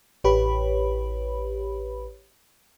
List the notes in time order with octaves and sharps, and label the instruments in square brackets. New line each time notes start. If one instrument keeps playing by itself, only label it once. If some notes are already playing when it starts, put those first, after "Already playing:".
[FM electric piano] A1 G4 B4 C#5 B5